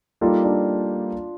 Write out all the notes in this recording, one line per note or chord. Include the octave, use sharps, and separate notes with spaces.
G3 A#3 D#4 F4 A4 D5
D4